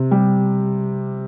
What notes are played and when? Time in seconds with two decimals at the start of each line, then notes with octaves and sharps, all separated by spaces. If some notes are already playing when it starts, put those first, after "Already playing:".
Already playing: C3
0.11 G3